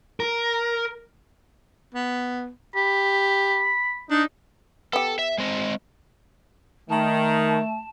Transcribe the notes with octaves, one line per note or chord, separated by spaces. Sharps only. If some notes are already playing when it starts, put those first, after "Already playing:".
A#4
B3
G4 B5
D4 D#4
B3 G4 A4
E5
G#3 C4 D#5
D#3 A3 A5